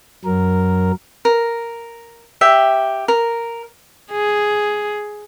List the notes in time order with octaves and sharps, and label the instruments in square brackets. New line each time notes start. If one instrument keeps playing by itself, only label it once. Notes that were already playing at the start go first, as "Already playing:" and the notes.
[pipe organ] F#2 F#3 A#4
[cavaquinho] A#4
G4 E5 G5
A#4
[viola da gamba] G#4